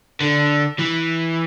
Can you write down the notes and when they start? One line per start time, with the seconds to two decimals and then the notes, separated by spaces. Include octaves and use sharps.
0.21 D3
0.79 E3